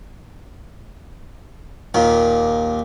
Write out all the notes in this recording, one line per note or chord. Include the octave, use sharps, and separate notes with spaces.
D#2 A#2